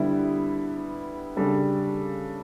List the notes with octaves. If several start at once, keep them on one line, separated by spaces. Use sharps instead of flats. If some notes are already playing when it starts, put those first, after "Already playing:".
Already playing: D3 G3 B3 E4
C#3 G3 D4 A4